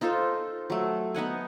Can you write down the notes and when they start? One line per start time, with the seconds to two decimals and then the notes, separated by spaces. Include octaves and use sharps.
0.01 D#4 F4 A4 C5
0.70 F#3 A3
1.14 B3 D#4 F#5 G#5